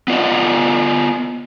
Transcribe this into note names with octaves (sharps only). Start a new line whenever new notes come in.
B3 F4 D5 D#5